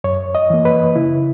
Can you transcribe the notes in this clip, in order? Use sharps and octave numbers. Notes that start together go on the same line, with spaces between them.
F#2 C#5
D#5
E3 A#3
B4
C#3 E4